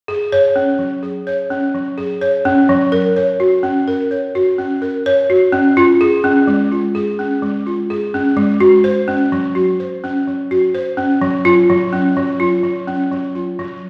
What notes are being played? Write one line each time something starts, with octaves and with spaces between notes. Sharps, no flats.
G#4
C#5
C#4
F#3
G#4
C#5
C#4
F#3
G#4
C#5
C#4
F#3
A#4
C#5
F#4
C#4
A#4
C#5
F#4
C#4
A#4
C#5
F#4
C#4
F4
G#4
C#4
G#3
F4
G#4
C#4
G#3
F4
G#4
C#4
G#3
F#4
C5
C#4
F#3
F#4
C5
C#4
F#3
F#4
C5
C#4
F#3
F4
F#3
C#4
F#3
F4
F#3
C#4
F#3
F4
F#3